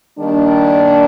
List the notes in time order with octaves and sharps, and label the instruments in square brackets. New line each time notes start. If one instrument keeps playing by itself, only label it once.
[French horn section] D#3 G3 A#3 D4